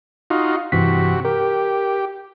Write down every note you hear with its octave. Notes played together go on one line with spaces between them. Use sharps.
D#4 F4 F#4
G2 C3 E3 F#4 B6
G4 A#4